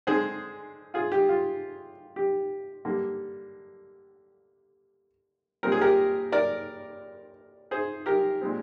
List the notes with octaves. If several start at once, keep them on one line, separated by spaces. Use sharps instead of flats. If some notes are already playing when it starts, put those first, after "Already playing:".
D3 G#3 C4 G#4 C5
F4 G#4
G4
F4
G4
D3 G3 A#3
A#2 G3 C4 A#4
G#4
G4 A#4
A#4 D5
G#4 C5
G4 A#4
A#2 G#3 C4